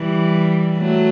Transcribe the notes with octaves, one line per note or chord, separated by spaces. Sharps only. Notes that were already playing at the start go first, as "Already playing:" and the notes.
Already playing: E3 G3
F#3 A3